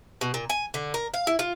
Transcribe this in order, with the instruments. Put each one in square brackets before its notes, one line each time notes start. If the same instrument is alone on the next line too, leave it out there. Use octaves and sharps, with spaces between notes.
[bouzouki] B2
A#2
G#5
D3
A#4
F5
E4
F4